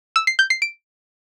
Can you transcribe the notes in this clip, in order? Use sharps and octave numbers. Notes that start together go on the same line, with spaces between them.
E6
C7
G6
C7
D7